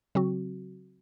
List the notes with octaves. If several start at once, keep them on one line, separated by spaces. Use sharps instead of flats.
C#3 F#3 C4 F#4